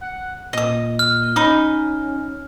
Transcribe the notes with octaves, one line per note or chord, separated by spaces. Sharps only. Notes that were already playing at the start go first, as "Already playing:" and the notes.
F#5
A#2 D#5 D#6
F6
C#4 D#4 B5 D#6